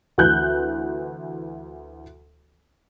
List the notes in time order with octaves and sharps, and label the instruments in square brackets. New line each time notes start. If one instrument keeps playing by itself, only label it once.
[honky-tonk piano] D2 E3 F#6 G6